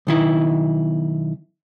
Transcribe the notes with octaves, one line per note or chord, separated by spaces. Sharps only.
B1 D#3 E4